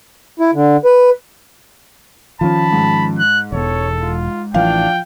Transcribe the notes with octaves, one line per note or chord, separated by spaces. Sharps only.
E4
D3
B4
D#3 F3 C#4 F4 A5 B5
G#2
F#6
E1 E2 A4 C#5
F4
A1 E3 F3 D4 F5 G5